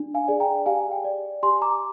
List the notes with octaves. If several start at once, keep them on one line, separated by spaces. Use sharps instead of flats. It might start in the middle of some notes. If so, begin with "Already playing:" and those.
Already playing: D4
F5 G#5
G#4 D5
G5 A#5
G4 F5 G#5
G5
D5
G4 G#5 C6
A#5 D6